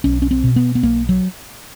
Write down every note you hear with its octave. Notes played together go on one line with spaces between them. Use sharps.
B1 C#4
C#4
C4
B2
B3
B3
B1 A#3
F#3